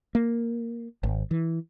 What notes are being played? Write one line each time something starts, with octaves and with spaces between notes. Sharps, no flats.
A#3
G#1
E3